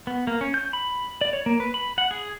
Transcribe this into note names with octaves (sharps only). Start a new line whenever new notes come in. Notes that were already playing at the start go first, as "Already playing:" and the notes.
B3
A#3
C#4
G6
B5
D5
C#5
A#3
B4
B5
F#5
G#4